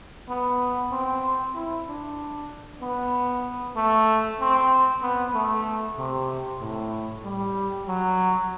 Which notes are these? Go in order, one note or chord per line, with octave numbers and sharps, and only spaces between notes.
B3
C4
E4
D4
B3
A3
C4
B3
A3
C3
A2
G3
F#3